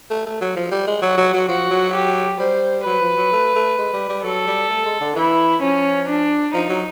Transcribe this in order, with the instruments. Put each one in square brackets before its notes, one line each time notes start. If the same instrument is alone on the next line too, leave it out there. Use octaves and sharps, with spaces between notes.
[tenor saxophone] A3
A3
F#3
F3
G3
G#3
[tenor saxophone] F#3 [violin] F#4
[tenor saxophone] F#3
F#3
[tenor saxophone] F3 [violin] F#4
[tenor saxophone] F#3
[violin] G4
[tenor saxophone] G3 [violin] C5
[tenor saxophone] F#3 [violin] B4
[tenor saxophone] F3
F#3
A3
A3
G#3
G3
G3
[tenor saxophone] F#3 [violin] A4
[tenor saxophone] G3
A3
G#3
D3
[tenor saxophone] E3 [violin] E4
[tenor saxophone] F3 [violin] C#4
[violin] D4
[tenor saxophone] F3 [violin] D#4
[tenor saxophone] F#3